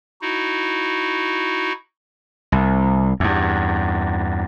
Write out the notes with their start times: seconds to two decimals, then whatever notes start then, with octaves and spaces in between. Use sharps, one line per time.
0.21 D#4 E4 F#4
2.52 C2
3.20 E2 G2